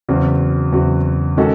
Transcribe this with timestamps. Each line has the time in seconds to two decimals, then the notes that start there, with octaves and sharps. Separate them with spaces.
0.09 E2 C#3 F#3 C4 F#4
0.72 E2 C#3 F#3 C4 F#4
1.37 D#3 G#3 C#4 F#4 A4